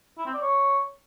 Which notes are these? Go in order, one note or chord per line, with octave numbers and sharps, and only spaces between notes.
E4
C4
D5
C#5